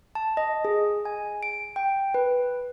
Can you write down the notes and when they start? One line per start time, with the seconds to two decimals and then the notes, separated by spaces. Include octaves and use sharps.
0.15 A5
0.37 D#5
0.65 G#4
1.05 G#5
1.43 D7
1.76 G5
2.14 B4